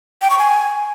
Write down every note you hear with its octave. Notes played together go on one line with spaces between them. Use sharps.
G5
C#6
G#5